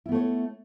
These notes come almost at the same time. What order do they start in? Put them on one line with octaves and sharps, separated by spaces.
E4 B3 A3 C#5